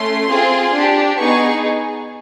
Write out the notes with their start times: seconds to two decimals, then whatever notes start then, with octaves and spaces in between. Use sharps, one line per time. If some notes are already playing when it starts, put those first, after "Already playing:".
Already playing: A3 C#4 C6
0.28 C4 F4 G#4
0.73 D4 G4
1.19 B3 D#4 G#4 C#6